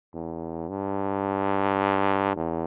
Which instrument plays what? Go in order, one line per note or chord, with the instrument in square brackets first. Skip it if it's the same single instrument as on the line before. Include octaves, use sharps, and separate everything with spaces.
[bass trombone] E2
G2
E2